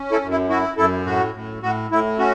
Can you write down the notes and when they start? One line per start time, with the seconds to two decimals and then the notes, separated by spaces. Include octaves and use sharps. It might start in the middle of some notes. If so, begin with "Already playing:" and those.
Already playing: C#4
0.11 E4 A4
0.22 F#2
0.31 E4
0.49 E4 F#4
0.77 F#2 E4 A4
1.06 A2 F#4
1.35 A2
1.62 A2 F#4
1.91 A2 E4
2.19 C#4 F#4